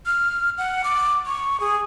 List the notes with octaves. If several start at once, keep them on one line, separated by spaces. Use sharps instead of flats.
F6
F#5
D6
C#6
G#4